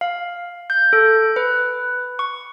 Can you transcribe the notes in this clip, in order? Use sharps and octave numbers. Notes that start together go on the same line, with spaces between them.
F5
G6
A4
B4
C#6